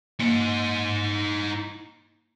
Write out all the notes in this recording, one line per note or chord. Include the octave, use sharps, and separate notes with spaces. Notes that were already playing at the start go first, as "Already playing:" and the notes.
A#3 D#4 C5